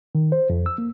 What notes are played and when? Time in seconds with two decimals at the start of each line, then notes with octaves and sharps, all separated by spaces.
0.15 D#3
0.32 C5
0.50 F2
0.66 E6
0.78 A#3